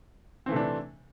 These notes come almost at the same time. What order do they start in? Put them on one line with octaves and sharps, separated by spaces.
C4 E3 A3 C3 D4